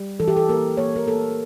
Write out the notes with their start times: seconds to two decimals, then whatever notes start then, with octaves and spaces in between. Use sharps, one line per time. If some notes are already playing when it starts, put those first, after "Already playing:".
Already playing: G3
0.20 E3 A4
0.28 G4
0.37 A4
0.49 A#3 A#4
0.77 A#3 C#5
0.96 A#4
1.07 A#3 A4